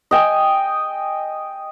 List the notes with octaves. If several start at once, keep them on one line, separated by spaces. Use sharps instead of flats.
D#5 G5 G#5